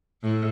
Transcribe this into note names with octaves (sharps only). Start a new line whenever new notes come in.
A2